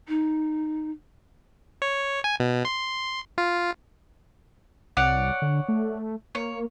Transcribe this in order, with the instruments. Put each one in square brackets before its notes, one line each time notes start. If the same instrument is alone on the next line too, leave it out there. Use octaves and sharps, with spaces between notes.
[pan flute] D#4
[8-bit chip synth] C#5
G#5
B2
C6
F4
[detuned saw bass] C2 [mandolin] C#5 D5 F#5
[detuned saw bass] D3
A3
[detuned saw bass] A#3 [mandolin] C#5